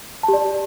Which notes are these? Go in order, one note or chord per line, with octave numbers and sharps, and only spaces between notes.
A5
G4
D5